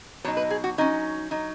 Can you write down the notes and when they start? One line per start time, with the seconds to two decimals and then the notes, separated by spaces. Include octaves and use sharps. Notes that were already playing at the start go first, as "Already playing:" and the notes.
0.24 B2 F#3 D#4 C#5
0.37 B4
0.51 G#4
0.64 F#4
0.78 F#3 C#4 D#4
1.31 F#3 D#4